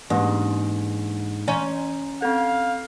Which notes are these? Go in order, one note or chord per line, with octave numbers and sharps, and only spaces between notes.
G#2 E3 A#3 D4
E3 C#4 A#5
C4 A4 F5